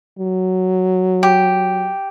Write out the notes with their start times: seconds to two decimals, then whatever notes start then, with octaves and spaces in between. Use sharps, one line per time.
0.19 F#3
1.23 G4